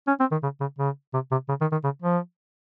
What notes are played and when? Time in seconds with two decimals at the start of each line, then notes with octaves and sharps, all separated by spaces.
0.07 C#4
0.20 C4
0.31 D#3
0.43 C#3
0.60 C#3
0.79 C#3
1.14 C3
1.31 C3
1.49 C#3
1.61 D#3
1.72 D#3
1.84 C#3
2.02 F3